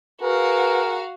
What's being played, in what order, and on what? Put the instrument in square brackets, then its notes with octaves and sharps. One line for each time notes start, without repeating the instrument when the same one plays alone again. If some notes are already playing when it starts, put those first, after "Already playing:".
[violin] F#4 F5 [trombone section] G#4 A#4 [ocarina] B4